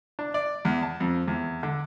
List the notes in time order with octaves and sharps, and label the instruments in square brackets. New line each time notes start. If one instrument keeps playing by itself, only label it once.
[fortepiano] D4
D5
E2
A5
F2
E2
D3